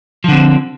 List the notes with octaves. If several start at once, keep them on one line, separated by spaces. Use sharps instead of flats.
D3 F3 C4